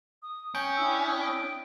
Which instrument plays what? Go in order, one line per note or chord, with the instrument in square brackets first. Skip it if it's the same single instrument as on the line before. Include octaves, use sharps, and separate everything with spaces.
[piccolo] D#6
[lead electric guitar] C#4 [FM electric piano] G5
[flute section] D4 E4 D#6 [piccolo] E6
[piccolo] D7